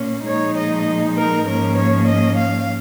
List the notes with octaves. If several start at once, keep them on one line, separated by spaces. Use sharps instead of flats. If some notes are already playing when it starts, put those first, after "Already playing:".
Already playing: A#2 A#3 C#4
A#2 F3 G#3 D#4 C#5
D#5
A#4
G#2 F3 A#3 C#4 A#4
C#5
D#5
F5